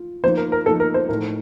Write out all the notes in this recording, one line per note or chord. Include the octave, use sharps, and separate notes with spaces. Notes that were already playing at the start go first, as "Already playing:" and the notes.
Already playing: F4
F3 A#3 D#4 C5
A#4
A#4
F3 A#3 D#4 A4
A#4
C5
A2 A3 D#4 A#4